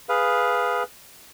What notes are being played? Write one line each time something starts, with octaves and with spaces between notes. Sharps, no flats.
G#4 B4 F5